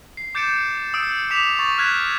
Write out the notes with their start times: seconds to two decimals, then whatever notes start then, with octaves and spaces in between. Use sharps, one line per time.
0.17 C7
0.35 D6 G6 A6 C#7 D7 E7
0.94 D#6 E6 D7
1.31 D6 B6 E7 F7
1.59 C#6 A6
1.78 F6 F#6 G#6 B6 E7